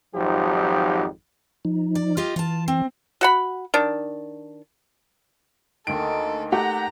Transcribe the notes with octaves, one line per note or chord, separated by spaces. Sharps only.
G#1 F2 F3 F#3 D#4 G4
F3 D#4
D5
F4 G4 D#5
E3 F4 A5
C4
F#4 F#5 B5
D#3 D4
D2 D#3 A#3 A4 D7
A3 G4 F#5 A#5